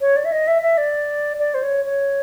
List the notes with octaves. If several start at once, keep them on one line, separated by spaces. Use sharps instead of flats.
C#5
D5
E5
D#5
E5
E5
D5
D5
C5
C#5
C#5